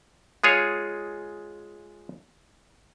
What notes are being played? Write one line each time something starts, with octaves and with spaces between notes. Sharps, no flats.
G#3 F4 G#4 C#5